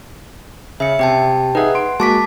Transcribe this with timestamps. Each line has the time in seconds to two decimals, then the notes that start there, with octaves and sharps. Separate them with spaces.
0.80 C#3 E5 C#7
0.99 C3 G4 G5 A5
1.55 D#4 G#4 B4 E5 F#5
1.75 C6 D7
2.00 G#3 A#3 F#4 A5 D6 B6